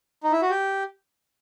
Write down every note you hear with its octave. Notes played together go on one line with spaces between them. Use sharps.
D#4
E4
F#4
G4